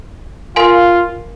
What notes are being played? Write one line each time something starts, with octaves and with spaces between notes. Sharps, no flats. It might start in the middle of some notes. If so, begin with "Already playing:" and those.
F4 A#4 F5 G#5 C6